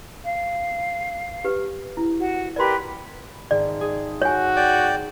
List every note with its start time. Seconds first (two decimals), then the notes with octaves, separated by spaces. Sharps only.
0.24 F5
1.45 G4 B4
1.97 E4
2.18 F#4
2.56 G4 A#4 B4 D5 C6
3.51 G#1 D5
3.81 G#4
4.22 F#4 C#5 G#5
4.56 D5 G5